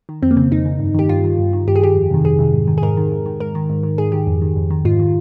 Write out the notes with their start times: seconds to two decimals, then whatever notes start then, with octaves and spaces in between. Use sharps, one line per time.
0.09 D#3
0.22 F2 C4
0.31 A#3
0.37 C#3 C4
0.51 F2 D#4
0.65 C#3
0.80 G2
0.94 D#3 G4
1.09 G2 F4
1.24 D#3
1.39 G2
1.53 D#3
1.68 G2 G4
1.76 G#4
1.81 D#3 G4
1.95 F2
2.11 C3 D#3
2.25 F2 G#4
2.39 C3 D#3
2.53 G#2
2.67 D#3
2.78 G#4
2.82 G#2 A#4
2.97 D#3
3.12 G#2
3.26 D#3
3.40 G#2 A#4
3.55 D#3
3.70 G#2
3.83 D#3
3.98 G#2 G#4
4.12 D#3 G4
4.27 F2
4.42 D#3
4.56 F2
4.70 D#3
4.85 G#2 F4
4.99 D#3